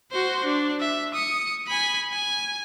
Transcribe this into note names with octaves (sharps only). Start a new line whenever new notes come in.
F#4 C5
D4
E5
D#6 C#7
G#5 B5
G#5